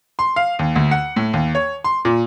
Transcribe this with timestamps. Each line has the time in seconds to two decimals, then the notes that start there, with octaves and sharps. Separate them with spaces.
0.19 C6
0.36 F5
0.59 D#2
0.76 D2
0.91 F#5
1.16 A2
1.33 D#2
1.55 C#5
1.84 C6
2.05 A#2